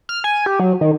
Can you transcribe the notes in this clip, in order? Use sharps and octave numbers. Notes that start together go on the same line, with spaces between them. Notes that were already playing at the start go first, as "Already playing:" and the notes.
F6
G#5
G4
F#3
D#3